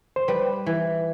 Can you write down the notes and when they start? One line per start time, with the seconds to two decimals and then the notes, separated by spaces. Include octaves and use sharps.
0.16 C5
0.28 G3 B4
0.66 E3